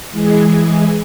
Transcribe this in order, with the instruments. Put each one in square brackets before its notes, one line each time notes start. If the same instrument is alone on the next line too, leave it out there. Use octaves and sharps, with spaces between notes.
[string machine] E3 G#3 G#4